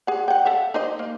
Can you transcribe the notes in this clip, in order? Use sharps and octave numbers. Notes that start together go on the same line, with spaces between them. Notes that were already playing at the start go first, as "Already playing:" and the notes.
G#4 F#5
F#5 G5
A4 E5 F5
D#4 C5 D#5
A#3